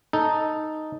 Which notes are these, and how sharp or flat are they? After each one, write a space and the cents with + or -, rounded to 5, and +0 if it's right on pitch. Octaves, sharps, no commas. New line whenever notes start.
D#4 +0 A4 +0